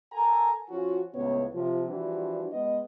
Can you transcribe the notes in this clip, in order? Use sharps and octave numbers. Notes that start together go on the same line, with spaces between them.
A4 A#4 G#5 A#5
F3 C#4 F4 F#4
C#2 A2 C#3 B3 C#5
C3 F3
E3 F3 G3 D4 F#4
G#3 B3 D#5